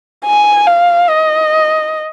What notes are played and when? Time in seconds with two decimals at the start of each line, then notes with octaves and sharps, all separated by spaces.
0.25 G#5
0.67 F5
1.09 D#5